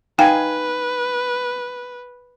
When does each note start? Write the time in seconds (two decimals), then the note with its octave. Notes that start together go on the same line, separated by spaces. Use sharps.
0.19 D#4 B4 F5 G5 G#5